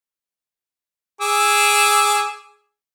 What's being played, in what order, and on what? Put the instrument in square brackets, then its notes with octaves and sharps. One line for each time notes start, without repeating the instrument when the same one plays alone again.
[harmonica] G#4 D6 E6